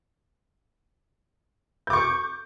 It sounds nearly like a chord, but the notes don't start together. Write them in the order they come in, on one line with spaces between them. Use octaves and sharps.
G6 D6 C#6